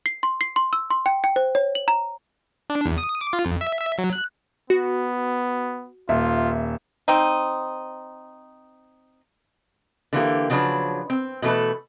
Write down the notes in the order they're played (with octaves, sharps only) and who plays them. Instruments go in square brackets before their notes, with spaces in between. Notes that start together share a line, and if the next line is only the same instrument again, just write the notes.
[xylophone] C7
C6
C7
C6
E6
C6
G5
G5
C5
C#5
F#7
A#5
[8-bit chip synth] D4
E2
D#6
D6
F4
F2
E5
E5
F#3
F#6
[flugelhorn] B3 [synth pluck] F#4
[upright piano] D#1 E5 [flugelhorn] F4
[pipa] C4 D#4
[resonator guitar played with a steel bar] D3 E3 A#3 G4
C#3 F3 F#3 D4 B4
C4
B2 E3 A3 A4 B4